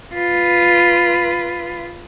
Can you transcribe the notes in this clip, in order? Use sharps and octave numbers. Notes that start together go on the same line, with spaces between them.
F4 B4